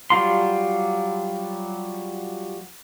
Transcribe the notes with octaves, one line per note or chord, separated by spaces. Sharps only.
F#3 G3 F4 C6